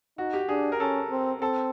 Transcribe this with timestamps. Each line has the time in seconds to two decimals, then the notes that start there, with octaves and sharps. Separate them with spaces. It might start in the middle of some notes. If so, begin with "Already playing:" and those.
0.18 D#4 F#4
0.33 G4
0.49 D4 G#4
0.72 A#4
0.80 C#4 A4
1.11 C4
1.41 C4 A4